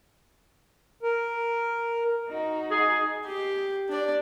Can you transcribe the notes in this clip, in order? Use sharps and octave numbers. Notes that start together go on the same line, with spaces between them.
A#4
D#4 F#4
G#4
G4
D4 D5